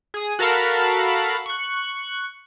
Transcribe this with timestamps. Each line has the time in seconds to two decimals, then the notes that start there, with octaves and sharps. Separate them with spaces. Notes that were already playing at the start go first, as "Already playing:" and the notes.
0.14 G#4 D#6
0.39 F#4 A4 A#4 F5 A5 B5
1.46 C#6 F#6